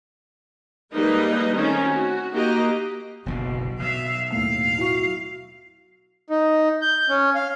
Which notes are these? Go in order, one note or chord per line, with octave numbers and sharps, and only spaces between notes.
G3 G#3 A#3 D#4 B4 D#5
D#3 A3 C4 C#4 D#4
F#4
A#3 D#4 F#4 G4 D#5 A#5
F#1 B1 B2 D3
B2 F#3 E5 F5
D#2 A2 F5 E6
E4 F#4 C#6
D#4
G6
C#4
F5